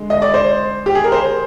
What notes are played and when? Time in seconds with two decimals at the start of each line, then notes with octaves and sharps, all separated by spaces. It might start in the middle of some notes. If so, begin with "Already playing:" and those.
Already playing: D3 G#3
0.10 D#5
0.22 D5
0.34 C5
0.86 G4
0.95 G#4
1.04 A#4
1.12 C5